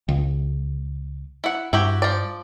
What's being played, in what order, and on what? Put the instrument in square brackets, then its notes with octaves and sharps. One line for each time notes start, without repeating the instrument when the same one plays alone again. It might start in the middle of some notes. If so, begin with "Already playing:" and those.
[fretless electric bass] C#2
[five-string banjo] E4 F#5
[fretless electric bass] G2 [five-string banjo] E4 F#4 G4
[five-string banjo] F3 D5